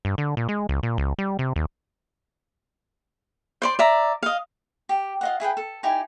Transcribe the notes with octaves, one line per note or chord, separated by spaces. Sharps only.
G2
D3
A#2
G#3
C#2
A#2
C#2
G3
C3
D#2
C5 D5 C6
D5 E5 A#5
D#5 F5
G4
F4 D#5 F#5
E4 G#4 B4 G5
A4
D#4 E4 G4 G#5